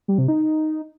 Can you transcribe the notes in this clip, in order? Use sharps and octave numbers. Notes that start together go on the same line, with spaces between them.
G3
C3
D#4